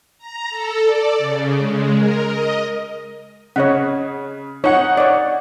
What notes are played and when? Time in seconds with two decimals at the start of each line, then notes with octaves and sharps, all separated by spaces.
0.18 A#5
0.50 A4
0.84 D5
1.18 C#3
1.58 G#3
1.95 A#4
2.25 D#5
3.56 C#3 C#5 D#5 F#5
4.64 D#4 C#5 F#5 C#7
4.97 C#5 D5